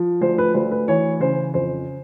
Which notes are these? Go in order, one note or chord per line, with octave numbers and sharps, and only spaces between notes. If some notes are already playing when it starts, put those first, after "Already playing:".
Already playing: F3
D2 C5
B4
D2 C5
B4
E3 C#5
C#3 C5
F2 C5